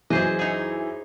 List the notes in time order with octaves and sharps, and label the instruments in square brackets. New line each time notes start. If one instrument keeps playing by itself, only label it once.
[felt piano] F#2 E3 [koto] G#4 C5 D#5
[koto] D#4 G#4